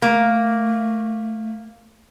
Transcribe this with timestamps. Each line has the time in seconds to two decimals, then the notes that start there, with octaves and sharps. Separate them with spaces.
0.02 A3 A#3